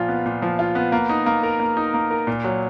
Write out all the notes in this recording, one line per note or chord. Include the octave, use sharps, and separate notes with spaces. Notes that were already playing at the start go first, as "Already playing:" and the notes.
Already playing: A#2 F3 F4
B3
A#2
F3
F4
B3
A#3
D#4
A#3
A#4
A#3
D#4
A#3
A#4
A#2
F#3